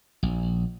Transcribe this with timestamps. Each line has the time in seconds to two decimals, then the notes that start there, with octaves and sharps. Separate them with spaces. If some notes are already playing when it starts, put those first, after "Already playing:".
0.23 A#1